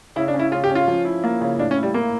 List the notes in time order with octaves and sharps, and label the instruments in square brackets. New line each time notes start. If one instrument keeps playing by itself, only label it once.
[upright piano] C#3 [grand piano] E4
[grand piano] D4
[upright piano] C#4
[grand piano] E4
[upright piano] C#3 [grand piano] F4
[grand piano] G4
[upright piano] C#4
[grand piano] F4
[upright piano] F3
E4
A#3
C#3
[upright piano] A2 [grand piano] D4
[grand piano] C#4
[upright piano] E4
[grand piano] G3
[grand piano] A#3 [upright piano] E4